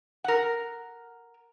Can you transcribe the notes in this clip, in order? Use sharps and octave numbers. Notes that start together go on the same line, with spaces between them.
A#4 F#5